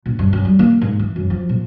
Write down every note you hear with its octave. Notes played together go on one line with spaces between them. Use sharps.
A#1
G2
F#2
G3
A#3
G#2
E3
F#2
F3
A#2